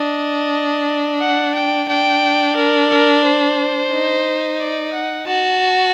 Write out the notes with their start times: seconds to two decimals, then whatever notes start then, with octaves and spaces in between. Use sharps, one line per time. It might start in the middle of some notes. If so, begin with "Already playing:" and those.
Already playing: D4 D#5
1.21 F#5
1.54 G5
1.88 D4 G5
2.56 A#4
2.90 A#4
3.24 C5
3.92 D#4
4.60 D5
4.93 F#5
5.27 F#4 A5